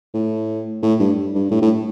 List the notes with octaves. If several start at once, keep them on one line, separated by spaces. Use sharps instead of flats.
A2
A2
G2
G2
A2
A2